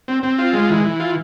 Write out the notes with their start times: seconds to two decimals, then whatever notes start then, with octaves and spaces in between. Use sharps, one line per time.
0.08 C4
0.23 C4
0.38 F4
0.53 G#3
0.70 E3
0.84 E3
1.00 F4